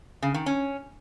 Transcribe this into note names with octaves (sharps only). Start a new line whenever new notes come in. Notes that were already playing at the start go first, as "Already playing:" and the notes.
C#3
D#3
C#4